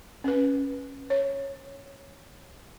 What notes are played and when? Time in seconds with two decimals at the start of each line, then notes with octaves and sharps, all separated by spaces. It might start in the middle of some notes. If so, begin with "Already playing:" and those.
0.24 C#4 B4
1.10 C#5